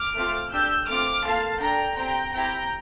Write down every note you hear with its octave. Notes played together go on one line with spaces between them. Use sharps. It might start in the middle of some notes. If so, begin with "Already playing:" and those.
Already playing: D6 F6
A3 C4 F4 A4
D4 G4 E6 G6
A3 C4 F4 D6 F6
A#3 F4 A4 F5 A5
D4 A4 G5 A#5
C4 G4 G5 A#5
C4 E4 G4 G5 A#5